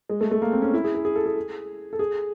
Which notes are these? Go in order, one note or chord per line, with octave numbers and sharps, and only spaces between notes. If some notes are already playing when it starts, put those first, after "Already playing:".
G#3
A3
A3
A#3
C4
C#4
E4
G#4
G#4
G#4
A4
G#4
A4
G#4